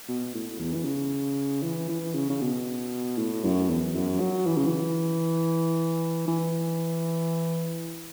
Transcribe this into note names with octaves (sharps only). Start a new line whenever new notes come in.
B2
A2
E2
E3
C#3
E3
E3
C#3
C#3
B2
A2
F#2
E2
F#2
F#3
E3
C#3
E3
E3